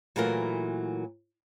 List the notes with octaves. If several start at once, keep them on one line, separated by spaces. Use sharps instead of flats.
A#2 E3 F#3 A3 E4 A#4